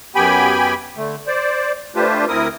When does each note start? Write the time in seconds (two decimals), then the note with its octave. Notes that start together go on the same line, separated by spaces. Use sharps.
0.15 F#2 B3 G4 G5 G#5 B5
0.97 D3 A3
1.27 C5 D5
1.96 A3 D4 F4 G4 B4 C5
2.28 D2 C4 E4 A#4 D#6